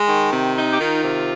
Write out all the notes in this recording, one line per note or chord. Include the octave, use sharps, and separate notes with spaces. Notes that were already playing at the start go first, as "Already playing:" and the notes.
Already playing: G#3
D#3
C3
D#4
G4
D#3 F4
C3